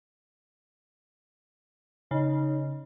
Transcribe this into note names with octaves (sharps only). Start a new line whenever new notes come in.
C#3 D#4